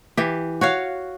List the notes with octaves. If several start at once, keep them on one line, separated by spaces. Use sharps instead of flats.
E3 G4
F#4 C#5 F5